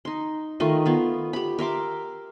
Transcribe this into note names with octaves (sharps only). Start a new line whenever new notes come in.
D#4 C6
D#3 A3 F4 D#5
B3 F4
G4 B5
A#4 E5 C6 D6